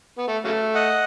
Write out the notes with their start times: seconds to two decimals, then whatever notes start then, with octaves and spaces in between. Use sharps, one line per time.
0.18 B3
0.27 A3
0.45 C#3 F#3 A3
0.74 D#5 F#5